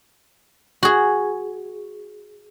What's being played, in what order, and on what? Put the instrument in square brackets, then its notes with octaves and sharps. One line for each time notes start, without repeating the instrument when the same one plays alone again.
[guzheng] F#4 G#4